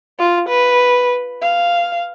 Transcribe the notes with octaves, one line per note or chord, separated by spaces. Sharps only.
F4
B4
F5